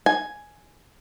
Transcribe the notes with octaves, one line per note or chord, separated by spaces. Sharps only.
G#5